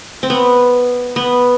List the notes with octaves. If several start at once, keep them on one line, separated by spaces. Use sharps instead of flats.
C4
B3
B3